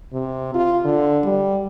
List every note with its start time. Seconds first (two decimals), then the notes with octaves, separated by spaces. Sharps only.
0.13 C3
0.54 F4
0.85 D3
1.24 G3